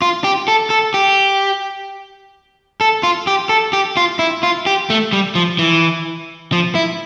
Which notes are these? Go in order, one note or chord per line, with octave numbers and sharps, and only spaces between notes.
F4
G4
A4
A4
G4
A4
F4
G4
A4
G4
F4
E4
F4
G4
A3
G3
F3
E3
F3
E4